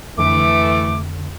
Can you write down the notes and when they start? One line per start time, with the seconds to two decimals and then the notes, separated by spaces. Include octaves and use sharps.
0.18 F2 D3 E3 A3 D6